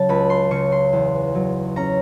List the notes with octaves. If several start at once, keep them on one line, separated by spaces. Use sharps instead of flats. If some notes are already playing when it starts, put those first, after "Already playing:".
Already playing: C#3 F#3 A5
C#2 B5
C6
C#3 C#6
C6
E2
F#3
C#4 A#5